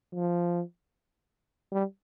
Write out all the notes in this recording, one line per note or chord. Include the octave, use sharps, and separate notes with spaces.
F3
G3